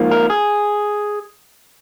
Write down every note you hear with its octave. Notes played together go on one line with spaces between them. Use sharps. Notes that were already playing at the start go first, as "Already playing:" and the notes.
Already playing: G#2 F3 A#3
A#4
G#4